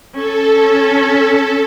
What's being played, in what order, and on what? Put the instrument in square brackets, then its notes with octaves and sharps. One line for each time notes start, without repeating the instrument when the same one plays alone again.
[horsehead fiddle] C#4 [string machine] A4
[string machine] A4